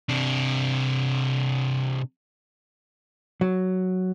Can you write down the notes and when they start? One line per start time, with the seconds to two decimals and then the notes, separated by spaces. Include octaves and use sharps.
0.09 C3 D4
3.41 F#3